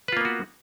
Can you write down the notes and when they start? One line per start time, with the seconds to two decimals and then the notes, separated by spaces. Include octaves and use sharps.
0.08 B4
0.12 F4
0.17 A#3
0.21 B3
0.25 F#4